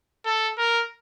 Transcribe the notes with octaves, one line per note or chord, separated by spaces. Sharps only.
A4
A#4